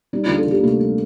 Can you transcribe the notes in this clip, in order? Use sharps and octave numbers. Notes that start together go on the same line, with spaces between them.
G3 D#4
D2 F4
A4
D2 G4
A#3
C3 A3
G3